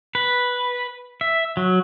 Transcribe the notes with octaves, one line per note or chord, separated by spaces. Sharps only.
B4
E5
F#3